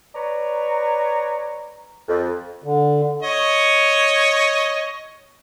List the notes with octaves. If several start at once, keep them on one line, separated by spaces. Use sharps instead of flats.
B4 C#5 D5 A#5
F2
D3
C#5 D#5 C#6